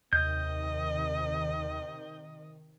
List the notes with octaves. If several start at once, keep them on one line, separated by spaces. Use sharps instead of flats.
D#2 C3 D#3 D#5 G6